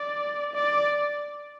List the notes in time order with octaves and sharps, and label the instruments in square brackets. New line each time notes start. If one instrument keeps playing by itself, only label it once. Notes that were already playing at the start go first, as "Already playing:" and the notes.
Already playing: [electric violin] D5
D5